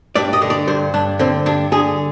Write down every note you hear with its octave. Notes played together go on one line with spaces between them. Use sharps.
G2 D5
D#5
D3
D5
G2 C5
G2 D4
D3 C4
G2 D4
D3 G#4